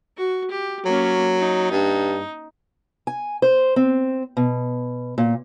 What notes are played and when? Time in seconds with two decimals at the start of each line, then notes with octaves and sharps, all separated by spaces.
0.17 F#4
0.50 G4
0.85 F#3 A#3 C#4
1.38 D#4
1.71 G2
3.07 G#5
3.42 C5
3.76 C4
4.37 B2
5.18 A#2